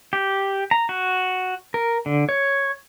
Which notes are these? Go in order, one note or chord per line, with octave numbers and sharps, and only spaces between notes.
G4
A#5
F#4
A#4
D3
C#5